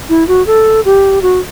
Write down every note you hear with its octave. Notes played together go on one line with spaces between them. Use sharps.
E4
F#4
A4
G4
F#4